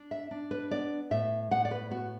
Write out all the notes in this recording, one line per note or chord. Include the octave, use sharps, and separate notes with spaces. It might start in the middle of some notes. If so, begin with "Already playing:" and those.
Already playing: D4
E5
D4
B4
B3 D5
A2 E5
A2 F#5
D5
B4
B3 F#4